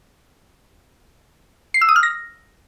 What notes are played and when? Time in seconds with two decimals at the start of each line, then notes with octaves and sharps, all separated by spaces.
1.74 C7
1.81 E6
1.89 D#6
1.96 F6
2.03 A#6